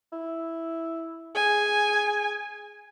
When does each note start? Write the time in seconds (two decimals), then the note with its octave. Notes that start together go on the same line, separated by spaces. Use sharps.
0.12 E4
1.35 G#4 G#5